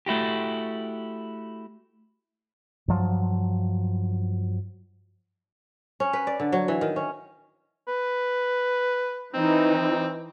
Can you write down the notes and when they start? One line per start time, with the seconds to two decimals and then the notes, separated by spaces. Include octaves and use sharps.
0.06 A3 E4 F#4 G4
2.88 G2 F3 F#3
6.00 C#4
6.13 B4
6.27 D5
6.40 D3
6.52 F#3
6.68 E3
6.81 D#3
6.96 C#4
7.88 B4
9.34 E3 C4 D#4